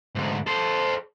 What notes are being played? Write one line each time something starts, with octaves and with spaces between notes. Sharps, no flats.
D2 G#2
A4 C5